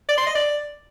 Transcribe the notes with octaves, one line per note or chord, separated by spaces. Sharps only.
D5
C6
D#5
D5